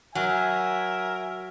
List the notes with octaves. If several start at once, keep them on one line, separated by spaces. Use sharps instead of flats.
F#3 A#4 E5 G#5